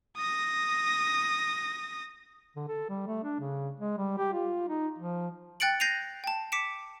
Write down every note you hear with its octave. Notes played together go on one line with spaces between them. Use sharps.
D#6 A#6
D3
A4
G3
A3
D4
C#3
G#3
G3
G4
F4
D#4
F3
G5 F#6 A6 C#7 D7 F#7
G6 A#6 C7 D#7 F7
G5 A5
D6 B6 C#7 D7 E7